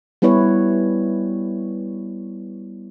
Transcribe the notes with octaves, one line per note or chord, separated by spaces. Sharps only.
G3 B3 E4 B4 C#5